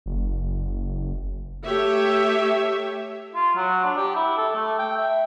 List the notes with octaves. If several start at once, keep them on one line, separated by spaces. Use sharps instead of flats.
F#1
A3 G4 C#5 E5
F4
F#3
D4
G4
E4
A4
A3
G5
E5